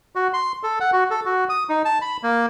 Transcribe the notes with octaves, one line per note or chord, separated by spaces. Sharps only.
F#4
C6
A4
F#5
F#4
A4
F#4
D#6
D#4
A5
B5
A#3